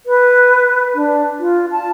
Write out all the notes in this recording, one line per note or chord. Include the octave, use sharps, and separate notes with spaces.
B4
D4
F4
A5